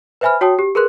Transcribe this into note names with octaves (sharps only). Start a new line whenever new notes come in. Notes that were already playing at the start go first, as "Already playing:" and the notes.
B4 C5 E5 G#5 B5 F6
F#4 C#5 G5 A5 D#6
G4
G#4 A#4 B4 C6 F#6